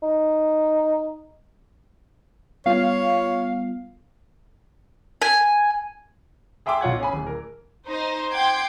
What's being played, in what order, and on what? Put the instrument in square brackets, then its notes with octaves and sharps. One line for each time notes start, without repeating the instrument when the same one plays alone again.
[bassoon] D#4
[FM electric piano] G3 B3 F4 [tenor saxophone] C#5 [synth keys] F5
[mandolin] G#5
[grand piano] G#4 E5 G5 C6 D6 E6
B1 F4 C#5 F#5 G#6
C#4 G#4 G#5 B5
D1
A#4
[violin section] D#4 C5
F#5 G5 C6 D6 G6 G#6